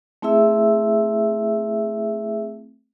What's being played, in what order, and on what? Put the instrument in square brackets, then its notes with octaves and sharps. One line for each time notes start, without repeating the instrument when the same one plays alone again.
[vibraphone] A3 C4 E4 G#4 E5 E6